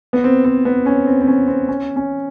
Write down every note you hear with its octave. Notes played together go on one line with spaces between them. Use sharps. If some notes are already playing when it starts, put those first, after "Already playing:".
B3
C4
C4
B3
C#4
C4
C4
C#4
C4
C#4
C#4